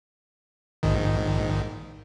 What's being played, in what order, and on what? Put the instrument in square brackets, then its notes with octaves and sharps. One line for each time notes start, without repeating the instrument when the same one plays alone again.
[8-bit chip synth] A#1 G#2 D#3